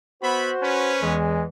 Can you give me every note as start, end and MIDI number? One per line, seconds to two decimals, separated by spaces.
0.22 0.51 59
0.22 0.93 66
0.22 0.99 72
0.22 0.51 76
0.22 0.51 83
0.62 1.17 61
0.62 1.17 71
1.02 1.46 40
1.02 1.46 52
1.02 1.44 56